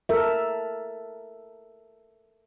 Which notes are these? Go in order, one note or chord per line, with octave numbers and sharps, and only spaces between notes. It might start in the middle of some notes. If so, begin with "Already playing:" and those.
A4 A#4 E5